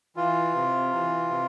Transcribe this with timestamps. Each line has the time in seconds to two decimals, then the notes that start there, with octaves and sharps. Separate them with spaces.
0.16 E3 F4
0.54 C3
0.93 E3
1.30 C3